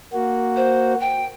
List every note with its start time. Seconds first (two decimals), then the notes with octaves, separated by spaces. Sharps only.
0.13 A#3 F#4
0.56 C5
1.00 G5